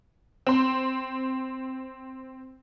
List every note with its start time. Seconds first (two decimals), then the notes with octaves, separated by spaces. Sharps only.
0.47 C4 C6